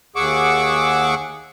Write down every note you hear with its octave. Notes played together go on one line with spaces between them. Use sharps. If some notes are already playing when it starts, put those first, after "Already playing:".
D#2 G#4 F#5 C#6 D6 E6